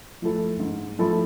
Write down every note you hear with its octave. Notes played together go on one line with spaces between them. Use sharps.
F3 A3 E4 A4
G#2
F3 A3 E4 A4